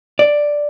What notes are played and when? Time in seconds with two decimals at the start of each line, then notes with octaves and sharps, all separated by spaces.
0.19 D5